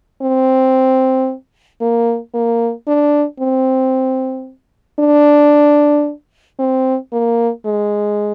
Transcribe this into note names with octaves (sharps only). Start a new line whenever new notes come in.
C4
A#3
A#3
D4
C4
D4
C4
A#3
G#3